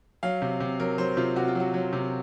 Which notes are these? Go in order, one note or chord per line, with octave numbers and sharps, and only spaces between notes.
F#3 F5
C3
C3
F#3 A#4
F#3 C5
C3 F4
C3 F#4
F4
F#3 F#4
F#3
C3